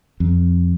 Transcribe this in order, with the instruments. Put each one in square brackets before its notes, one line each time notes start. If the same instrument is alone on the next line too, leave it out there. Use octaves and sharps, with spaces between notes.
[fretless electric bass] F2